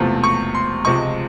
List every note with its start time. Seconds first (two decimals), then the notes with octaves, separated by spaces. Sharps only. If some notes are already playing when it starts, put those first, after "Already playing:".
Already playing: E1 E2 C3 F3 A3
0.24 C#6
0.55 C6
0.85 C#2 C3 F3 G#3 C#6